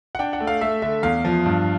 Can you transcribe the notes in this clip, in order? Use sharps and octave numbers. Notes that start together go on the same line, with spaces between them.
F#5
D4 G5
F#5
A3
F5
A3 E5
D3 E5
E2 F5
F3
G2